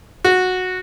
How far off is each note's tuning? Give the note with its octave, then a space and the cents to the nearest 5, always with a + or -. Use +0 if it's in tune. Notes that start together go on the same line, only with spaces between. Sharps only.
F#4 -10